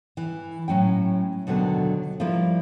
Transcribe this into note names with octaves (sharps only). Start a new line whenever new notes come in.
E3
A2 F#3 C#4 G5
D#2 B2 D3 F#3 B3
F3 G3 A#3 E4